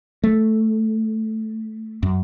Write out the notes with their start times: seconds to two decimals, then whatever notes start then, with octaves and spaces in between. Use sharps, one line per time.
0.24 A3
2.03 F#2